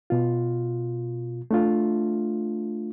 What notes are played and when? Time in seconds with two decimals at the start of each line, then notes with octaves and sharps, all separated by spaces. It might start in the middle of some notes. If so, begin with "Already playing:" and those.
0.10 B2 F4
1.51 A3 D4 F4